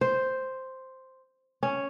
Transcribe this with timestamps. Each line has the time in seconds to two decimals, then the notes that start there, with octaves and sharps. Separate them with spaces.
0.01 C5
1.63 C#4